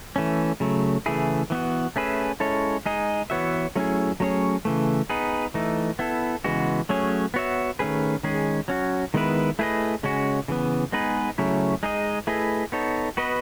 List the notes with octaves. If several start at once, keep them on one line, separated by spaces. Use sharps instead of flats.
E3 A3 C#4
C#3 F#3 A3
C#3 E3 A3 E4 G#4
E3 B3 F#4
A3 C#4 G#4 B4 E5
G#3 C#4 E4 A4 C#5
G#3 D#4 G#4 D#5
E3 B3 F#4 C#5 E5
F#3 A3 C#4 E4 G#4
F#3 A3 C#4 G#4 C#5
C#3 E3 A3
B3 D#4 G#4 B4
E3 A3 D#4
B3 E4 A4
C#3 E3 G#3 B3 F#4
F#3 A3 C#4 G#4 C#5
B3 F#4 C#5 E5
D#3 A3 C#4 G#4 B4
D#3 G#3 C#4 G#4
F#3 C#4 F#4
D#3 G#3 B3 E4 B4
A3 E4 G#4 B4 D#5
C#3 G#3 C#4 F#4
C#3 E3 B3
G#3 B3 D#4 G#4 B4
C#3 F#3 A3 C#4 E4
G#3 D#4 G#4 D#5
A3 E4 G#4 B4 D#5
B3 D#4 A4 C#5
B3 F#4 B4 D#5